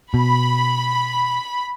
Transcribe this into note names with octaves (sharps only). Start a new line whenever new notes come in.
B2 B5